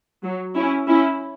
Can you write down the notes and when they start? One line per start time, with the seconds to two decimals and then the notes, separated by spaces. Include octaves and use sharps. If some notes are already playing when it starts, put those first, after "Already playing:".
0.23 F#3
0.55 C#4 E4
0.87 C#4 E4